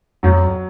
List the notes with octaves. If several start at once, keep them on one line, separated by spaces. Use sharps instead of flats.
F2 F#3